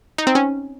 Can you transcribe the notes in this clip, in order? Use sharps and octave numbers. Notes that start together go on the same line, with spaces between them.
D#4
C4
C#4